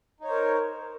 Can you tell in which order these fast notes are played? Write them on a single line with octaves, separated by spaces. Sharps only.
D#4 C#5 C5 A#4